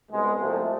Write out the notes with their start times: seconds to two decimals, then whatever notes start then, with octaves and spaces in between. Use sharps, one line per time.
0.11 C2 B2 G#3
0.39 C2 C3 F3 A3